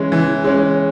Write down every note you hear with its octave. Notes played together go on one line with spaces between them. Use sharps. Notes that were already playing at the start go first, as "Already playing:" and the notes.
Already playing: E3 G#3 C#4
E3
G#3 C#4